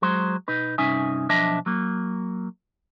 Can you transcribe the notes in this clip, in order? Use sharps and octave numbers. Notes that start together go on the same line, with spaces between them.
F#3 G#3 C5
B2 D#4 B4
G2 C3 C#4 D#4 E5 G#5
B1 F3 D4 D#5 E5 A5
F#3 A#3